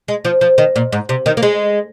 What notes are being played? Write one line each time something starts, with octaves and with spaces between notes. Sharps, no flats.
G#3
F3
F3
D#3
A#2
G#2
C3
D#3
A#3
G#3